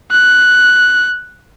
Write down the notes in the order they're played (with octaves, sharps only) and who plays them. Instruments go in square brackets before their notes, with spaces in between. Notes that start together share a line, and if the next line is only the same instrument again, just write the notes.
[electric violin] F#6